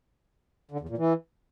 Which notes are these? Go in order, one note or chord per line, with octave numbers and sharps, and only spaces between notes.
D3
E2
A#2
E3